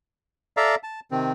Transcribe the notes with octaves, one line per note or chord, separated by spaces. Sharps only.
A4 D5 E5 F5 A#5
A5
C3 D#3 C4